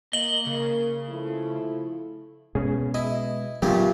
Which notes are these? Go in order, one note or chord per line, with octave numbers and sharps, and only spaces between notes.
A#3 D#5 F#7 G7
C#3
F3 A3 E4
B2 G#3 B3 C#4 G#4
E4 D#5
A#2 C#3 F#3 A3 B3 D4 F4 G4